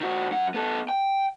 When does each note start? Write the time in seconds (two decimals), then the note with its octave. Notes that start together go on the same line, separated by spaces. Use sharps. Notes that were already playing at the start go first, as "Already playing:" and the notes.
0.01 D#3 F#4
0.31 F#2 F#5
0.54 B3 A4
0.89 G5